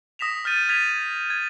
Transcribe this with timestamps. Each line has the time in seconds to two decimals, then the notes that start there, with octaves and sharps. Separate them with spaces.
0.19 D#6 A#6 B6 E7 F7
0.44 D#6 F6 G6 A6 D#7
0.69 F6 G#6 A6 B6 D#7 F7
1.30 G#6